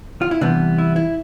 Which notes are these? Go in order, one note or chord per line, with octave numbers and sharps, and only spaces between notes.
F4
E4
C3 E3 G3 B3 D4
E4
E4